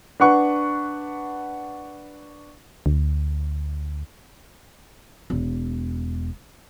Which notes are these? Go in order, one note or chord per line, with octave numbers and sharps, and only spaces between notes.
D4 B4 F#5 C#6
D2
E1